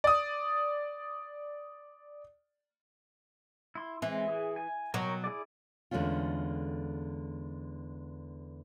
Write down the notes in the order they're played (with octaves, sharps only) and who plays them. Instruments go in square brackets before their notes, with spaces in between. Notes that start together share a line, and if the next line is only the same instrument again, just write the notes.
[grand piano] D5 D#6
[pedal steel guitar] E4 C6
[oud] E3 [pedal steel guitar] G#3 C4
[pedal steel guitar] G#4
G#5
[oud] B2 F#3 [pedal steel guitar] A#4 C#5 G5
[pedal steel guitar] E4 G#4 D5
[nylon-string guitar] E2 D3 G#3 A3 C#4 F4